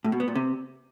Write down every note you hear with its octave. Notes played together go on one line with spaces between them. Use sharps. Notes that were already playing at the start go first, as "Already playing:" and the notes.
A2
B2
B3
A#2
C3